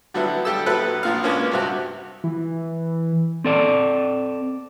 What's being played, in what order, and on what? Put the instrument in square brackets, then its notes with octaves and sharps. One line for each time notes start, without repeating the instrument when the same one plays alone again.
[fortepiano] D3 F#3 G3 B3 E4
G3 G4 A4 E6
A#1 F#3 E4 A4 B4 F#6
A#1 A#2 F5
G#3 A#3 B3 C#4 D4 F4
G2 C3 F#4
[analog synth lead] E3
[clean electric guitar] C4 A4 D5